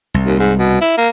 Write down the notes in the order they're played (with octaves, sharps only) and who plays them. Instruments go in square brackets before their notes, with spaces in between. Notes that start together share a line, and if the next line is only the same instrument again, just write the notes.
[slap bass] C2
[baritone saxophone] D#2
G#2
B2
E4
A#3